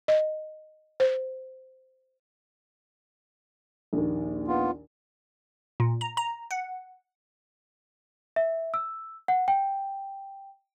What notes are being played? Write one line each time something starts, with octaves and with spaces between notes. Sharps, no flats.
D#5
C5
A#1 D#2
B3 F4
A#2
A#5
A#5
F#5
E5
E6
F#5
G5